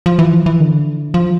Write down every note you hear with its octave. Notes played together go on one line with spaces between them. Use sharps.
F3
E3
F3
E3
D3
F3